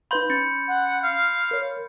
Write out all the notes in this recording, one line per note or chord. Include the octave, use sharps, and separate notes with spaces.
D#4 B4 F5 B5 C6 G6
C#4 G6 A6 C#7
F#5
F5
A#4 C#5